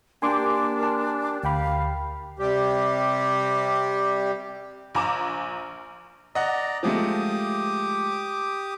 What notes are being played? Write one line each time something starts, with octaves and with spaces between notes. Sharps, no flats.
A#3 D4 G4 G#5 C6 D6
A#4 A5
D2 F5 G5 B5
C3 G3 G4
A#1 G#5 A#5 D6 E7
D5 D#5 F#5 A#5
F3 G#3 A3 G4 D6 D#6